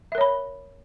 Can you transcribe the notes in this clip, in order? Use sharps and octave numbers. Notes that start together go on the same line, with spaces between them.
A#4 C#5 E5 B5